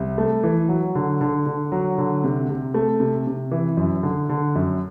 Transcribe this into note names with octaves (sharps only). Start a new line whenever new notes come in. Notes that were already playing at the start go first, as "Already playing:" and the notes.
Already playing: C2
A3
E3
F#3
D3
D3
D3
F#3
D3
C3
C3
A3
C3
C3
E3
F#2
D3
D3
F#2